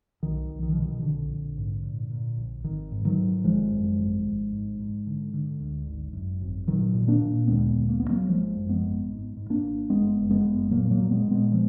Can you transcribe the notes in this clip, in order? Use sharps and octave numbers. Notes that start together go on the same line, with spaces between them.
B1 D#3
B1
D#3
B2 F3
D#3
A#1 D3
A#1
G#2
A#2
A#2
A#1
G#1 D#3
G#2
D#3 F#3
G#2
G#1 F3 G#3
F#2
G#1
G#1
G#2
G#2
D3
D3
D2
G#1
F#2
G#1
A#2 D#3 F#3
A#2
A#3 D4
A#2
D2 G#3 B3
D2
A#3
D2 B3
F#3 A#3
G#1 F3 G#3
F#2
G#3 B3
G#1
G#2
G#2
A#3 D4
G#1
F#1 G#3 B3
F#1
G#3 B3
F#1
A#2 F#3 A#3
F#3 A#3
A#2
G#3 B3
A#2
G#3 B3
F3 G#3